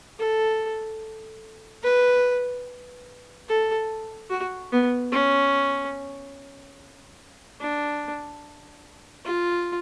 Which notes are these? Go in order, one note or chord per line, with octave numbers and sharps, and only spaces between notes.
A4
B4
A4
F#4
B3
C#4
D4
F4